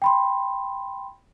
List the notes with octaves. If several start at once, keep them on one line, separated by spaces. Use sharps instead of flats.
G5 B5 C6